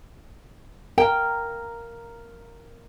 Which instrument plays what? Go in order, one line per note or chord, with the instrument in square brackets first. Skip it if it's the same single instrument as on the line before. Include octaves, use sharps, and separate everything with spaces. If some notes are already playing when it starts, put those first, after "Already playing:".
[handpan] A#4 [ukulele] G5